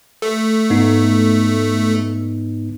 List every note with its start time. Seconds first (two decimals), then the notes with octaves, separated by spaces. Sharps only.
0.22 A3
0.70 G#2 B3 D#4